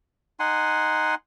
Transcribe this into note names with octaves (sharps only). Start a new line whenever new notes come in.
D#4 F#5 G#5 C6